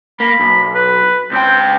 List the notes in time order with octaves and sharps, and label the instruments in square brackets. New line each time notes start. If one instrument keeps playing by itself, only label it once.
[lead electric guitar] A#3 [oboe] B5
[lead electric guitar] B1
[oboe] B4
[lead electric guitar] C#2 G5 [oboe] C4